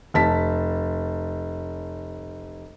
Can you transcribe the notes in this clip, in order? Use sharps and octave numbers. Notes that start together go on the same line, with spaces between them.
F1 A5 B6